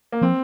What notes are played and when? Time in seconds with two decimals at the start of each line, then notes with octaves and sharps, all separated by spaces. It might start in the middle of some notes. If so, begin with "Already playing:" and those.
0.12 A#3
0.21 F3 C4